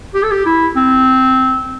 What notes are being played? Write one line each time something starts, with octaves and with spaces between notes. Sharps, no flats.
G4
A4
G4
E4
C4